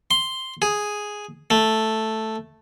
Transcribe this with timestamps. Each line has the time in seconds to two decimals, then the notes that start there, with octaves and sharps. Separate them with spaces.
0.11 C6
0.62 G#4
1.50 A3